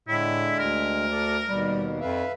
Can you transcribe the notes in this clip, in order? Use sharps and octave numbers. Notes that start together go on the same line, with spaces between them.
A2 D3 G#3 E4
D2 A#4
A4 D5
D#2 B2 G3
F2 B4 E5 F5